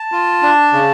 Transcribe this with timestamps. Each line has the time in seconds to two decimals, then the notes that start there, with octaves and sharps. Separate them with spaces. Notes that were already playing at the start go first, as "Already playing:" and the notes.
Already playing: A5
0.12 F4
0.42 D4
0.73 C#3